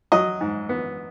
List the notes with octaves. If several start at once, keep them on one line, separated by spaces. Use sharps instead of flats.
F#3 D#5
G#2
B3